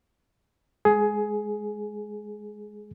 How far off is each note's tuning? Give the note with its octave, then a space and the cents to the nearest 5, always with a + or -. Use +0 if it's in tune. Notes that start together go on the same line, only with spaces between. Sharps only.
G#3 +0 G#4 +15